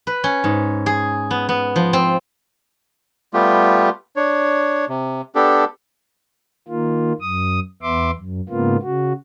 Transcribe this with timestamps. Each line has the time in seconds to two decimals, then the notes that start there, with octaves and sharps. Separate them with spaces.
0.07 B4
0.24 C#4
0.44 G#2
0.86 G#4
1.31 B3
1.49 B3
1.76 F3
1.93 C4
3.34 G3 A3 B3 F4 G4
4.16 D4 C#5
4.89 C3
5.35 B3 D4 G4 A4
6.68 D#3 A#3 F4
7.21 F#2 D#6
7.82 E2 B3 E5 C6 D6
8.17 F#2
8.49 G#2 C#3 A#3 B3 F4
8.82 C#3 F#4